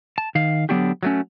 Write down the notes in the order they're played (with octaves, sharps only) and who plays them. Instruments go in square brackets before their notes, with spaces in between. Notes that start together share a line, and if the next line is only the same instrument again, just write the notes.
[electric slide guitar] A5
D#3 F5
D3 F#3 B3 D4 F#4 G4
F#3 A3 C#4